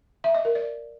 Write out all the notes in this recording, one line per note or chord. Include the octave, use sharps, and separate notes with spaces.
E5
D#5
A#4
D5